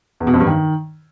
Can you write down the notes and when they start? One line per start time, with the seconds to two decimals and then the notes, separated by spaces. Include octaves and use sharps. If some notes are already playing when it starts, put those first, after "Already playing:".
0.20 E2
0.27 B2
0.34 F2
0.40 G2
0.47 D#3